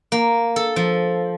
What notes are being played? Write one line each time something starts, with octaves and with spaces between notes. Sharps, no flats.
A#3
A4
F3